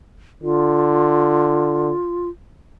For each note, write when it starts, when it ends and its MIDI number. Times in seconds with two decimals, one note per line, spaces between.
0.43 1.93 50
0.43 2.28 65